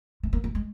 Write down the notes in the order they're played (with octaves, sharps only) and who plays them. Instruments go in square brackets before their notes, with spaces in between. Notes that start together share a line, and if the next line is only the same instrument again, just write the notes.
[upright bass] A3
A#3
A3
G#3